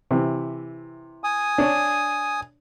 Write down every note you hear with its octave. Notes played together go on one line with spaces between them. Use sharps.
C3 E3
G#5 D#6
D4 C#5